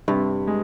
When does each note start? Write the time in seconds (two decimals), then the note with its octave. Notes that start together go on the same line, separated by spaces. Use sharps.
0.08 G2 C3
0.47 G#3